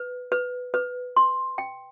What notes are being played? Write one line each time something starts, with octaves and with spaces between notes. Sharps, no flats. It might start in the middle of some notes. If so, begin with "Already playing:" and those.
Already playing: B4
B4
B4
C6
G5